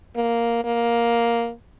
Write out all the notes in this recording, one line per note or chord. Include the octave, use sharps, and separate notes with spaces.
A#3
A#3